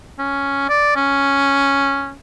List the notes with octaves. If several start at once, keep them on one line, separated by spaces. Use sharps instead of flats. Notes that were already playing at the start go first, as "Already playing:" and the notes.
C#4
D5
C#4